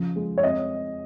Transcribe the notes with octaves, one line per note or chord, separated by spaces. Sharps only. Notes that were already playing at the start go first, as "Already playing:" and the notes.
Already playing: C#3 F3
G#3
C#5
C4 D#5